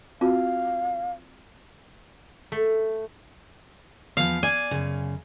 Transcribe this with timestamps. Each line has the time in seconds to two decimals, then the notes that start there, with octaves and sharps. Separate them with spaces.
0.21 C4 F4 F#4 F5
2.52 A3
4.17 E2 F3 B3 F5
4.43 D5 G#5
4.71 F#2 C#3